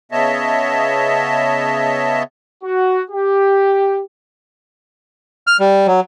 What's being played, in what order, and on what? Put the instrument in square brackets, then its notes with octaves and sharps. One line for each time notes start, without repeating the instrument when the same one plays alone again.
[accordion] C#3 B3 C#5 D#5 E5 A5
[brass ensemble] F#4
G4
[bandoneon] F6
G3
F#3